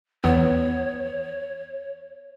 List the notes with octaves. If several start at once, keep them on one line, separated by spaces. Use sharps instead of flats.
E2 B3 C#5